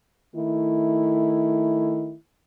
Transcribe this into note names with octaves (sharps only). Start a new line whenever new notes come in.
D#3 A3 E4